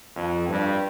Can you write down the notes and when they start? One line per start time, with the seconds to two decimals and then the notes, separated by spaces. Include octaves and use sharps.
0.17 F2
0.49 G2